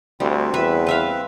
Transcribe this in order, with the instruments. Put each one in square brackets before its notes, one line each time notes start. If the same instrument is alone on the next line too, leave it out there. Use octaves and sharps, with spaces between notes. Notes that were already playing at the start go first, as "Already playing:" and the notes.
[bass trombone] D2 [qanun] G3 [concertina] C4
[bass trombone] E2 [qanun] B4 E5
[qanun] B4 E5 F5